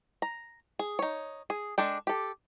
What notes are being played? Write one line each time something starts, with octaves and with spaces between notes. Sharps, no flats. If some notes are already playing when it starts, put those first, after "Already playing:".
A#5
G#4
D#4 C#5
G#4
G#3 D4 A4 G5
G4 A4